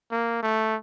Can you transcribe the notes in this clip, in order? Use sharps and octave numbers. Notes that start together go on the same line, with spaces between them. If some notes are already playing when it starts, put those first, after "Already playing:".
A#3
A3